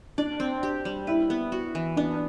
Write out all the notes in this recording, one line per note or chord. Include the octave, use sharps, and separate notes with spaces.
D4 D5
C4
G4
G3
E4 B4
B3
F#4
E3
B3 D4